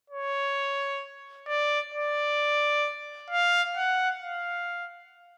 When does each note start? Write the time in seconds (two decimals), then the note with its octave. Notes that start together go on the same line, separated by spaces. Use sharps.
0.10 C#5
1.48 D5
1.94 D5
3.31 F5
3.77 F#5
4.22 F5